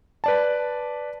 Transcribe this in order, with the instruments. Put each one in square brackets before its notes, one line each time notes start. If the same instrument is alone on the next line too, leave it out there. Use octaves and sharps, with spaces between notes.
[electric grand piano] B4 D5 A5